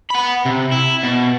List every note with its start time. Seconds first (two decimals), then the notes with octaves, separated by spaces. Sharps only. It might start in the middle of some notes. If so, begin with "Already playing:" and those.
0.10 F#5 B5
0.45 C3
0.71 E4
1.03 B2